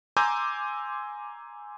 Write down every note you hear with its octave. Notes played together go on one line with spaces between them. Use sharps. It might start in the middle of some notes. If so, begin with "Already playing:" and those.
G#5 A#5 C6 D6 E6 G6